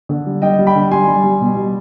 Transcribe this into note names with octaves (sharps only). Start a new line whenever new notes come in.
D3
G3
G3 D#5 G5
G3
G5 B5
D3
G3 G#5 C6
G3
G3
B2
G3